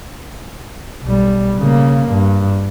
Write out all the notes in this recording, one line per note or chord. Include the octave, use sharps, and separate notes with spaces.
B1 G3
C#3 A#3
G2